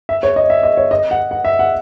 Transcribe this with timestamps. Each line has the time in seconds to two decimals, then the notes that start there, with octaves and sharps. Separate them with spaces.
0.09 E5
0.23 C#5
0.36 D#5
0.50 E5
0.63 D#5
0.77 C#5
0.91 D#5
1.11 F#5
1.31 F#5
1.45 E5
1.59 F#5